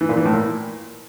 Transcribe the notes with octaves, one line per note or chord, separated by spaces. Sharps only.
E3
A#2
E3
A2
A#2